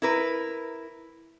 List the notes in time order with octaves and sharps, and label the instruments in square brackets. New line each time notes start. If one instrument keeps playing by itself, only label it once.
[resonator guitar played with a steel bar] E4 A#4 B4